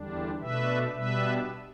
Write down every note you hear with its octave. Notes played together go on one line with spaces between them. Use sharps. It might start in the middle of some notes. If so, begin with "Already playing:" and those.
Already playing: E2 D3 G3 D4
B2 A3 D4 B4 E5
B2 G3 B3 D4 B4 E5